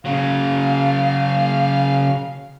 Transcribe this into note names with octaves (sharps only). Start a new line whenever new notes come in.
C#3 F#3 F5